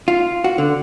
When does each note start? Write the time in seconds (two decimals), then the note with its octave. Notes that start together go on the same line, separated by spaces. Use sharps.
0.08 F4
0.44 F#4
0.58 D3